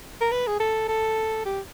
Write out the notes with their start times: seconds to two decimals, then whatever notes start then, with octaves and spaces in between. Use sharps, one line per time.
0.21 A#4
0.31 B4
0.47 G#4
0.60 A4
0.88 A4
1.45 G4